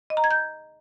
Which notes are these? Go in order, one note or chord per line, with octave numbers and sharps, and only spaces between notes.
D#5
A#5
G#6
G6